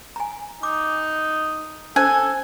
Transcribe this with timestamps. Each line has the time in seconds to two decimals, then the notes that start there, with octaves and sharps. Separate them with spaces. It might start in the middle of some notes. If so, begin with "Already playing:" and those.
0.16 G#5 A#5
0.63 D#4 D6
1.96 C#4 A4 C5 G#5